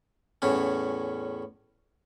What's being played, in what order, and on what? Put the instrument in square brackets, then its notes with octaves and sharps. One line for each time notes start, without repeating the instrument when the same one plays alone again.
[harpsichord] E2 A2 C#4